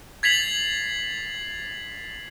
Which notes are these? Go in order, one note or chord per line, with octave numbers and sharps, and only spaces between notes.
G#6 A6 B6 C7 F7 F#7